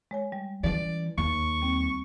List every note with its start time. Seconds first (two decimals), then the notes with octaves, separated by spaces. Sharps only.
0.11 G#3 C#5 G#5
0.32 G3
0.64 E3 C#4 D5
1.18 D#2 C#6
1.62 G3 C4